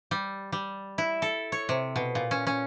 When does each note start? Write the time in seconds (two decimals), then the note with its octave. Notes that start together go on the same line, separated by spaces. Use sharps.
0.11 G3
0.52 G3
0.98 E4
1.22 A4
1.52 C#5
1.69 C3
1.96 B2
2.15 A#2
2.31 C#4
2.47 C#4